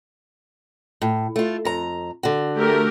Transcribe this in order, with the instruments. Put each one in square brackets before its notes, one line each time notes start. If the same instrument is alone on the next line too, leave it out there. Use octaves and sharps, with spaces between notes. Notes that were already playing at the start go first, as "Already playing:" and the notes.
[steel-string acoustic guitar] A2
A3 F4
F2 A#5
D3 F#4
[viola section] A3 G4 A#4